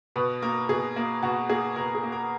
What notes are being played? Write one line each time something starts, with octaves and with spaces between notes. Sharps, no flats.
B2 B4
A#3 A#4
B2 G#4
A#3
B2 F#4
A#3 G#4
B2 A#4
G#4
A#3
A#4